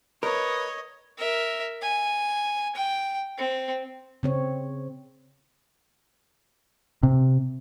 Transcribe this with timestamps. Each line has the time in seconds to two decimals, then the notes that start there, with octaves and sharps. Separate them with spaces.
0.23 A#4 B4 C#5 D#5
1.18 A#4 E5
1.82 G#5
2.75 G5
3.38 C4
4.23 C#3 C4 C#5
7.03 C3